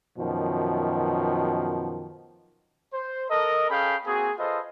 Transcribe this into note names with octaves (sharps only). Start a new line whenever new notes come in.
F#2 B2 D#3 F3
C5
A4 A#4 D#5
C#4 G#4 A4 F5 G5 B5
A#3 C4 F#4 G#4
F4 A4 B4 C5 D#5